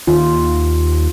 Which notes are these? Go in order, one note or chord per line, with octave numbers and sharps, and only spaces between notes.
D#2 F4